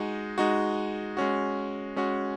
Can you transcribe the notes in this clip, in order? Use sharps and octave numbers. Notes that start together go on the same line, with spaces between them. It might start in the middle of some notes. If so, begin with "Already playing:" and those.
Already playing: G#3 D#4 F#4
G#3 D#4 F#4
G#3 C#4 F#4
G#3 C#4 F#4